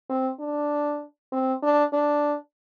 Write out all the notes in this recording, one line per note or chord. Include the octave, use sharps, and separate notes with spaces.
C4
D4
C4
D4
D4